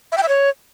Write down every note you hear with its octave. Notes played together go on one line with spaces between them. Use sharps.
E5
G5
E5
C#5